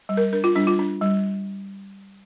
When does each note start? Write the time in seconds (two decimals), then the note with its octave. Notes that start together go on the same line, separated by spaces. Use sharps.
0.09 G3
0.17 A#4
0.33 D4 A#4
0.44 F4
0.55 G3 D4
0.67 F4
0.79 D4
1.01 G3